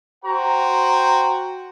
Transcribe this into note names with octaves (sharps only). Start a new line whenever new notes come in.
F#4 C5 G5 A#5